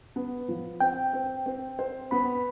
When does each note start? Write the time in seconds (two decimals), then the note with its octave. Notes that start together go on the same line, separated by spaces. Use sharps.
0.16 B3
0.48 F3
0.81 C4 G5
1.13 C4
1.46 C4
1.79 C5
2.11 B3 B5